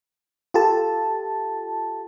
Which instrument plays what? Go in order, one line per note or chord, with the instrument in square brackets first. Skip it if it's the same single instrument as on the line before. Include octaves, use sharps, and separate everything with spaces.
[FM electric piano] F4 G4 A4 A5